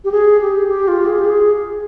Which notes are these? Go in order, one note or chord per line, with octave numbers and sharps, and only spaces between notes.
G4
G#4
G4
G4
F4
G#4
G4
G#4